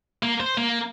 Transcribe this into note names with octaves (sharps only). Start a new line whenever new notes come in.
A#3
C5
A#3